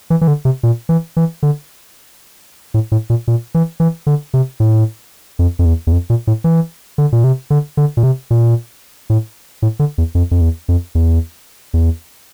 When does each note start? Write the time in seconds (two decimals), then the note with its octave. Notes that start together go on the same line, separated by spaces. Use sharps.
0.10 E3
0.21 E3
0.28 D3
0.45 C3
0.63 A#2
0.89 E3
1.17 E3
1.43 D3
2.74 A2
2.92 A2
3.10 A#2
3.28 A#2
3.55 E3
3.80 E3
4.07 D3
4.34 C3
4.60 A2
5.39 F2
5.59 F2
5.65 E2
5.87 E2
5.92 F2
6.10 A#2
6.27 A2
6.44 E3
6.98 D3
7.12 A#2
7.24 C3
7.50 D3
7.77 D3
7.97 A#2
8.03 C3
8.31 A#2
9.10 A2
9.62 A2
9.79 D3
9.98 E2
10.15 F2
10.31 F2
10.41 E2
10.68 F2
10.95 E2
11.74 E2